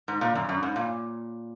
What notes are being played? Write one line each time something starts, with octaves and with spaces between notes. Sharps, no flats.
G#2
A#2
F#2
F#2
G#2
A#2